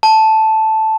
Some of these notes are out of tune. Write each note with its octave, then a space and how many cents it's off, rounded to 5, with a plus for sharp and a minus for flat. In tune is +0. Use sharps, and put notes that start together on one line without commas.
A5 -5